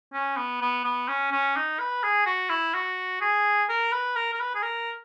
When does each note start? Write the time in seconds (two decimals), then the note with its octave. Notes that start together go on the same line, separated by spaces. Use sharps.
0.13 C#4
0.37 B3
0.61 B3
0.84 B3
1.09 C#4
1.32 C#4
1.56 D#4
1.79 B4
2.03 G#4
2.26 F#4
2.50 E4
2.74 F#4
3.21 G#4
3.69 A#4
3.93 B4
4.16 A#4
4.33 A#4
4.40 B4
4.55 G#4
4.63 A#4